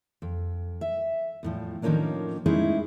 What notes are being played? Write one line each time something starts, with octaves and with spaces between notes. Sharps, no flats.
F2
E5
E2 A2 F3
A2 D#3 F3 A#3 C#4 D4
G#3 A3 C#4 D#4 E4 G#4